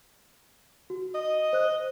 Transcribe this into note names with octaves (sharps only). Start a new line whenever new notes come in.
F#4
D#5
C5 F#6